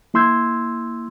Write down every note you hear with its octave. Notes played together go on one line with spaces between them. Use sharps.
A#3 E4 C6 E6 G6 G#6